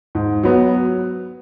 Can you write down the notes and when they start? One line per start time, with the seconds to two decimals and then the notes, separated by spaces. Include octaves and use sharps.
0.15 G#2
0.43 F#3 B3